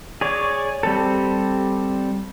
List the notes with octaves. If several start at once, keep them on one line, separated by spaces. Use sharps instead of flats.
G#4 C#5 D5
G3 C4 A4